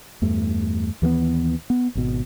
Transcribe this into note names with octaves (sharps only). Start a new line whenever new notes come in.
E2 G2 A3
D#2 E3 G#3 B3
B3
G#1 B2